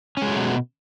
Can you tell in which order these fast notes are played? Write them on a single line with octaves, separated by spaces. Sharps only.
C#4 G#3 F#3 A3 B2